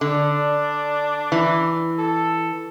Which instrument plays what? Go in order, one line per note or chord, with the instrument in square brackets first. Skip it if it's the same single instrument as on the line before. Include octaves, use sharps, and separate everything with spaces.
[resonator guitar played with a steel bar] D3 [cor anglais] D4
[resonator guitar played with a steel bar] E3
[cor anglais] A4